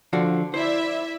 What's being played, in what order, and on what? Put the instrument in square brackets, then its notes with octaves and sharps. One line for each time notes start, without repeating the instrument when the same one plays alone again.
[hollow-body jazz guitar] D3 F3 F#4
[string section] E4 D5 E5 [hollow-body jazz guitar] C5